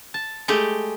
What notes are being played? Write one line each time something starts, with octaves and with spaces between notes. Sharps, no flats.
A5
G#3 A3 G4